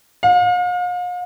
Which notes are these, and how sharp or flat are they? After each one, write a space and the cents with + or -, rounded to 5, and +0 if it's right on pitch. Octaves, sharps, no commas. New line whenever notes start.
F5 +40